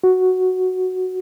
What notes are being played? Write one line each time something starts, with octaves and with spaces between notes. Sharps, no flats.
F#4